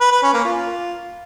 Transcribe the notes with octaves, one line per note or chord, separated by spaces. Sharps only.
B4
B4
C#4
A#3
F4